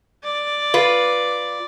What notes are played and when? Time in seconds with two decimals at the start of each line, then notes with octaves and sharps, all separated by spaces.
0.24 D5
0.74 F4 B4